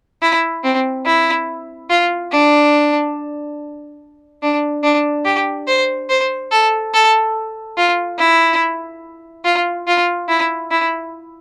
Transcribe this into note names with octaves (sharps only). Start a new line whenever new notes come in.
E4
C4
E4
F4
D4
D4
D4
G4
C5
C5
A4
A4
F4
E4
F4
F4
E4
E4